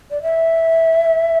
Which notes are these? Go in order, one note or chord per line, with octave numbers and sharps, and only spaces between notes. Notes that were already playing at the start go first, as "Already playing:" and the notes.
D5
E5